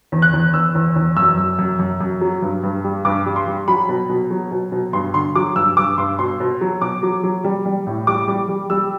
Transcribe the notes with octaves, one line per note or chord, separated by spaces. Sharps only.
E2
F#6
E2
E2 E6
E2
E2
F#2 E6
F#2
F#2
F#2
F#2
F#3
G2
G2
G3
G2 D6
G3
C6
G3
F#3 B5
B2
B2
F#3
B2
B2
G2 C6
D3 C6
F#3 D6
G2 E6
G2 D6
G2 C6
B2 C6
B2
F#3
B2 D6
F#3
F#3
G3
G3
A2
G3 D6
G3
G3
G3 E6